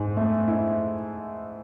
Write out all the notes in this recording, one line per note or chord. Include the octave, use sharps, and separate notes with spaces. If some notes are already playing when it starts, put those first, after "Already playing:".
Already playing: G#2
A3
E4